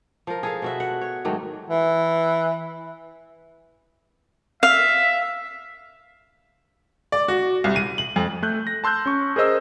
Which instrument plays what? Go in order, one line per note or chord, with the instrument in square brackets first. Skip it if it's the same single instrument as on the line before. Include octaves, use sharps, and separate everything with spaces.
[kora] F3 A#4
G#4 A4 F5
B2 F#4 E5
F#5
C#5
G#2 D#3 F#3 A3
[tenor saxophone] E3
[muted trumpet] E5 [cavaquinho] F5
[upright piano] D5
F#4
C2
D#7
F#7
F2
[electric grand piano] A3 F#6 G6
A#6
A5 C6 E6 F#6 G6
C#4 C#6
G#4 A#4 C5 D#5 E6